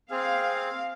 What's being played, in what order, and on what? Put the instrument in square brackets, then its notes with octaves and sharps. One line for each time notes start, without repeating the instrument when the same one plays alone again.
[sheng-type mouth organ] C4 G#4 [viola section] F5